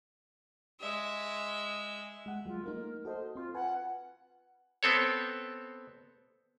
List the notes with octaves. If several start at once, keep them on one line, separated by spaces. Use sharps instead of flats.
G#3 E5
G#3 F#5
F#3 G#3 F4
A3 A#3 D#4 A#4
F#4 A4 C5 D#5
C4 F4 C6
F4 B4 F#5 G#5
B3 C4 A4 C#5